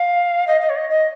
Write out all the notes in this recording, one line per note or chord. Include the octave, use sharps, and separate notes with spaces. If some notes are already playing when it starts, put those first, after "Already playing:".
Already playing: F5
D#5
D#5
C#5
D#5
D#5